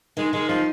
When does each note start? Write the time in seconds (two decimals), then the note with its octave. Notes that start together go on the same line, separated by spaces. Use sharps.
0.17 D#3 G#3
0.33 D#3 G#3
0.49 F3 D#4